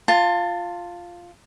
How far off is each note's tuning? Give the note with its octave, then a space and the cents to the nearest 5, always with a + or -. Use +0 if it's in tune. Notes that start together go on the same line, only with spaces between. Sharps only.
F4 +0 A5 +25